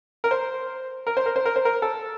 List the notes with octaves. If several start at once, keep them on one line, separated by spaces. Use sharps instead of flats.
A#4
C5
A#4
C5
A#4
C5
A#4
C5
A#4
A4